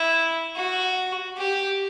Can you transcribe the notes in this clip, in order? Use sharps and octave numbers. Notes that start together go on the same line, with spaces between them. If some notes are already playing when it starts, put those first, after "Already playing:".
Already playing: E4
F#4
G4